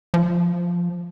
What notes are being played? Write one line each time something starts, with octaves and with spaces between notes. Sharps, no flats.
F3